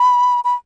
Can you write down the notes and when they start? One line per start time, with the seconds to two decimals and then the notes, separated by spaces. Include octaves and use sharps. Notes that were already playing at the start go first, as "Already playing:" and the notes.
Already playing: B5
0.44 B5